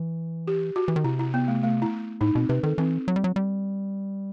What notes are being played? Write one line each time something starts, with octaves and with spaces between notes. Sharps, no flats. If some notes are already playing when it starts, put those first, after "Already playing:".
Already playing: E3
G4
F#4
E3
D#3
C3 E4
E4
B3
A3
A3
E4
A2 D#4
B2 C4
C3 B4
D#3 A4
E3 C4
F#3
G3
F#3
G3